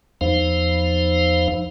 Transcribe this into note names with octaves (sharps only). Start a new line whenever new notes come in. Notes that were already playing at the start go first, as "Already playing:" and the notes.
E2 F3 D#4 C5 F5